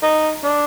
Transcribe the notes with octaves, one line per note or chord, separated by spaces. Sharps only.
D#4
D4